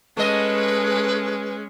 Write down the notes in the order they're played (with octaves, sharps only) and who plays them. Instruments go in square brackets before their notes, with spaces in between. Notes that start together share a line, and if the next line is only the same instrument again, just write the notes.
[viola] G#3 C#4 [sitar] A3 D#5 [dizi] B4